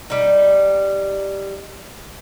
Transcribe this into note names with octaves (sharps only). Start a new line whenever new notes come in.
G3 D#4